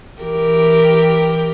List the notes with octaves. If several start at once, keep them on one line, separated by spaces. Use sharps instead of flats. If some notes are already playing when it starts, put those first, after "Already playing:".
E3 G4 A#4